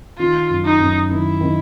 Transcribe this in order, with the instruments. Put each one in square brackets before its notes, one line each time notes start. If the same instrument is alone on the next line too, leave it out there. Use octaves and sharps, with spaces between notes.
[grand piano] D#3 [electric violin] F4
[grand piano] F#2
[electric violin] D#4
[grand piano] F#2
[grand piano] D#3 [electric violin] E4
[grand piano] D#3